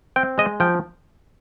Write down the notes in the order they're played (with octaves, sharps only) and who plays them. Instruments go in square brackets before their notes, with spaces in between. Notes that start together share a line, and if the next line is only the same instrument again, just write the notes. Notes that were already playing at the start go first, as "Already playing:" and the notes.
[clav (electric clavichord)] C4 G5
G#3 D#5
F3 G5